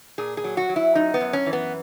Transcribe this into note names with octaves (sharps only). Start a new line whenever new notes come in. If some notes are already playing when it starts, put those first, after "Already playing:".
A#2 G#4
G#4
F#3
F#4
F#3
E4
F#2 D#4
B3
F#2
C#4
E3
B3